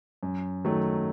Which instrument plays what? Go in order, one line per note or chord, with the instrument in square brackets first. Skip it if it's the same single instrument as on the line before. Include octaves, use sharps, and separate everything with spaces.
[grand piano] F#2
D#3 F#3 A3